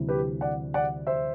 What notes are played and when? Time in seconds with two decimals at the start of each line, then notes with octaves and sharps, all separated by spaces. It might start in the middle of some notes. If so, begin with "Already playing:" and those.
Already playing: D2 C3 E3 G3
0.09 G4 B4
0.41 D5 F#5
0.74 D5 F#5
1.07 C5 E5